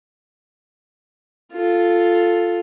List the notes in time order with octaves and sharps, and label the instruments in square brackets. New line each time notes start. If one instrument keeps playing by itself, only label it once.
[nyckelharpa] F4 A4